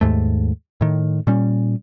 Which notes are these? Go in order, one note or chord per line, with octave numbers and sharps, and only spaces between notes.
D#2 G#2 A3
A2 D#3
A#2 G3 C#4